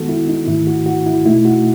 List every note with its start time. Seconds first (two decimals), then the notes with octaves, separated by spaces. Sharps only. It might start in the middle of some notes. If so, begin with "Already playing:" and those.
Already playing: D#3 G#3 B3 D#4 F#4 A4
0.09 E4
0.28 D#4
0.47 G#2 D#3 A3 E4
0.67 F#4
0.86 F#4
1.06 E4
1.26 B2 A3 D#4 E4
1.45 F#4